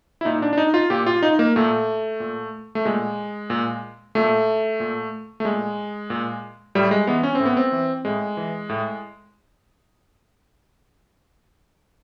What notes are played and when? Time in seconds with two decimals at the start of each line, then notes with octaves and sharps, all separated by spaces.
0.21 E4
0.25 A#2 D#4
0.42 D4
0.53 D4
0.58 D#4
0.74 F4
0.90 A#2 G4
1.06 F4
1.23 D#4
1.39 A#3
1.56 A#2 A3
2.20 A#2
2.75 A3
2.85 A#2 G#3
3.50 A#2
4.15 A#2 A3
4.80 A#2
5.40 A3
5.45 A#2 G#3
6.10 A#2
6.75 A2 G3
6.91 G#3
7.07 E3 B3
7.23 C#4
7.35 A2 C4
7.45 B3
7.57 C4
7.72 E3
8.05 A2 G#3
8.37 E3
8.69 A2